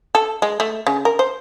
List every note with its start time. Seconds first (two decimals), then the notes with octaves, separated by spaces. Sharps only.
0.15 A4
0.42 G#3
0.60 A3
0.87 C#3
1.05 A#4
1.19 C5